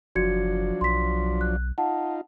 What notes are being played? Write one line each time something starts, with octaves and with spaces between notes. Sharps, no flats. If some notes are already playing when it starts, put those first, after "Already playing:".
F#1 F3 F#3 D4 F#4 G#6 C#7
B1 C6 B6
F#6
D#4 F4 F#5 A5